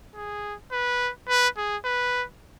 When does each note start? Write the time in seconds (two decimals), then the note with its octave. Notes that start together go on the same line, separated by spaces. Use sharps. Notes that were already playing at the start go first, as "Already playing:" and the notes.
0.15 G#4
0.72 B4
1.28 B4
1.57 G#4
1.85 B4